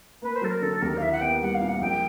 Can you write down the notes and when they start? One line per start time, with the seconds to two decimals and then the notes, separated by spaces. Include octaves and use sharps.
0.22 A#3 B4
0.35 C5
0.41 F#3 A4
0.48 A#4
0.62 D3 A4
0.81 D#2 A#4
0.97 F5
1.02 E4 E5
1.12 F#5
1.21 B3 G5
1.41 G3 F#5
1.54 F5
1.61 A#2
1.68 F#5
1.81 A#1 G5